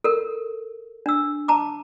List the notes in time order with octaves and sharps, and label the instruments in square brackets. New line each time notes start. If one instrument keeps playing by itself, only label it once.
[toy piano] A4 A#4
D4 E6
A5 A#5 D6